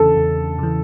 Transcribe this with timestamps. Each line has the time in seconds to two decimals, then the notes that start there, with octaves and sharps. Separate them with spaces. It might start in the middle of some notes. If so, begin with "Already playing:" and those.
Already playing: E2 C#3 E3 A4
0.16 E2
0.59 C#3 E3